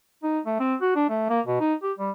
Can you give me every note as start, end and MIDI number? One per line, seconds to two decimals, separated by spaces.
0.23 0.40 63
0.46 0.56 57
0.60 0.75 60
0.81 0.92 66
0.96 1.07 62
1.09 1.27 57
1.30 1.41 58
1.46 1.60 47
1.60 1.74 63
1.83 1.93 67
1.98 2.11 55